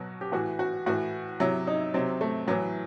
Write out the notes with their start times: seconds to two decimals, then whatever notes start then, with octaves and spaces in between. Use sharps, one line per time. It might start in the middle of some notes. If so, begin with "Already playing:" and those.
Already playing: B2 F#3 F#4
0.21 G4
0.32 A2 E3 F#4
0.59 F#4
0.86 A2 E3 F#4
1.40 C3 F#3 E4
1.67 D#4
1.94 C3 F#3 C4
2.21 A3
2.48 A2 E3 F#3